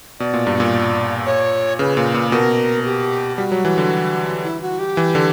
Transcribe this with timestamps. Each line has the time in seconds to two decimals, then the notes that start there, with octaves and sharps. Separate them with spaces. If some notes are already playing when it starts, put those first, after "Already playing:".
0.20 B2 D5
0.34 A#2
0.47 G2
0.60 A#2
1.26 C#5
1.79 C#3 B4
1.97 A#2
2.14 A#2
2.32 B2 A#4
2.85 G4
3.38 G3 F#4
3.52 F#3
3.65 E3
3.78 D3
4.44 E4
4.62 F#4
4.79 G4
4.97 E3
5.15 D3